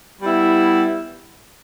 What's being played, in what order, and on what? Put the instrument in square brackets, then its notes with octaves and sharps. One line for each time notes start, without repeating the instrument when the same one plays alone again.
[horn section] G3 B3 E4